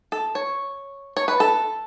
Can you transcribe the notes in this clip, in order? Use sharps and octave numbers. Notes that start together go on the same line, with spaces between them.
A4
C#5
C#5
B4
A4